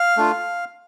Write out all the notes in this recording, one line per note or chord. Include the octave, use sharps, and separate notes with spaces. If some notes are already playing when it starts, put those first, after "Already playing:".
Already playing: F5
A3 D4 F4